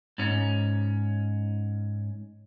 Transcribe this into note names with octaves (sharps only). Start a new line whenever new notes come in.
G#2 C#4